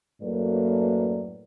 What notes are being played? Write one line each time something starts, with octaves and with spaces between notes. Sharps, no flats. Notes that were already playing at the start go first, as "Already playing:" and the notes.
F#2 A2 F#3 A#3 B4 D5